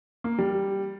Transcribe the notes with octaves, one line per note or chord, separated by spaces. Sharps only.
A#3
G3